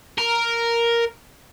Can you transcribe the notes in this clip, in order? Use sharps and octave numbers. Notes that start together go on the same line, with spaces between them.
A#4